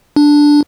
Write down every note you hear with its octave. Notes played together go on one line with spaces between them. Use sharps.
D4